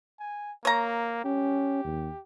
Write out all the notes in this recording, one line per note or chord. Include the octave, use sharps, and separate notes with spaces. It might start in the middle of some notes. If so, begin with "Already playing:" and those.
G#5
A#3 C#5 A#5
C#4 G4
D#2